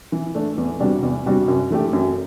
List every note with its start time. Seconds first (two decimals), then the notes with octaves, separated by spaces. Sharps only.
0.12 E3
0.35 A3 D4
0.58 E2
0.80 C3 G3 D4 F#4
1.03 E2
1.26 C3 G3 D4 F#4
1.48 F#2
1.70 E3 A3 D4 G4
1.93 F#2